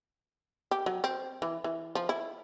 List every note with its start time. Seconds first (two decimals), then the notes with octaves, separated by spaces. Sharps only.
0.71 G4
0.86 F#3
1.04 C4
1.42 E3
1.64 E3
1.95 F3
2.09 E4